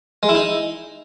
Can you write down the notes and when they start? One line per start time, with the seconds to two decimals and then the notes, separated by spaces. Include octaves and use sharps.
0.23 G#3
0.29 E4
0.35 D#4